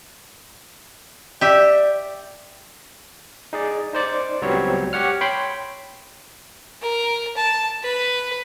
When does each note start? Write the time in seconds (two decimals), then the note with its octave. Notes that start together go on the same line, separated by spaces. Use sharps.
1.41 G4 D5 E5
3.53 D#4 G#4 D5
3.93 D#4 C5 D5
4.42 C#2 F#3 G3 B3 C4 C#5
4.93 G4 C#5 F#5 F6
5.21 C#5 G5 B5 C6
6.82 A#4
7.36 A5
7.83 B4